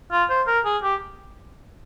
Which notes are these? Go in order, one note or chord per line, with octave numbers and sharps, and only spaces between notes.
F4
C5
A#4
G#4
G4